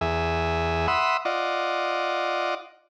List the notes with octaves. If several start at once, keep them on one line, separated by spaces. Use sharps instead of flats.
E2 G#4 E5
E5 F#5 B5 C6 D#6 E6
F4 D5 D#5 F#5